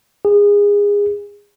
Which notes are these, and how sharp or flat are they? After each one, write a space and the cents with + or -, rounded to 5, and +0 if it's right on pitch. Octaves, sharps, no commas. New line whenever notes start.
G#4 -25